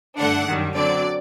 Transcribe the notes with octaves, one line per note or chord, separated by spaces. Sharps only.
G2 D3 A3 D4 F#5
F#2 D#3 G3
D3 F#3 C4 D5